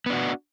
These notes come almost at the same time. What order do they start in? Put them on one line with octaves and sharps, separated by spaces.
B3 D4 F#4